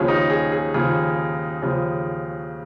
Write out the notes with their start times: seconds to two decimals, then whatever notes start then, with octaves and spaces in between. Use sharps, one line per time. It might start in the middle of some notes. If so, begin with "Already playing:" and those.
Already playing: D#2 C#3 F3 C#4
0.08 D#4
0.30 G#4
0.52 G#4
0.74 D#2 C#3 F3 G#4
1.62 D#2 C#3 F3